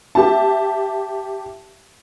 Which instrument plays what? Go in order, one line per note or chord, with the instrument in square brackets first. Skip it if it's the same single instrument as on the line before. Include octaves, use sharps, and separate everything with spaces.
[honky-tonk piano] G4 E5 A5